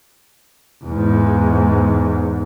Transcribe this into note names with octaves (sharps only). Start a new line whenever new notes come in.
E2 G#2